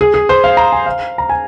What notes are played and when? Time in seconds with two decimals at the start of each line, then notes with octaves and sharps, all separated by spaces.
0.01 G#4
0.14 G#4
0.29 C5
0.44 F5
0.57 A#5
0.72 G#5
0.86 F5
1.18 A#5
1.30 G#5